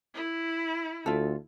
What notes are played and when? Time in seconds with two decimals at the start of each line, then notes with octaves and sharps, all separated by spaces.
0.14 E4
1.06 D2 F4 A4